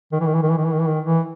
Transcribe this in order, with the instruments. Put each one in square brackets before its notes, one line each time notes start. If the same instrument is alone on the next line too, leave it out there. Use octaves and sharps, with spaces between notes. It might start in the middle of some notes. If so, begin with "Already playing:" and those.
[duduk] D#3
E3
D#3
E3
D#3
E3
D#3
E3
D#3
E3
D#3
E3